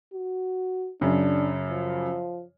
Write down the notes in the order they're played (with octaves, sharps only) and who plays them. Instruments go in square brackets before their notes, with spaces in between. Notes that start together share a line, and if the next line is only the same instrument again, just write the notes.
[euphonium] F#4
[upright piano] F#2 C#3 [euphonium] D4
[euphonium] F3